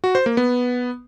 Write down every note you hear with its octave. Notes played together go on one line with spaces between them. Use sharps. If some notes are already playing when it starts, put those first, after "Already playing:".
F#4
C5
A#3
B3